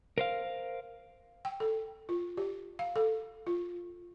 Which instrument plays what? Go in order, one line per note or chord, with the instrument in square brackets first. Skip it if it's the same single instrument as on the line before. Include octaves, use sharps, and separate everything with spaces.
[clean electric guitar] A#4 C5 F5
[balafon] G5
A4
F4
G4
F5
A4
F4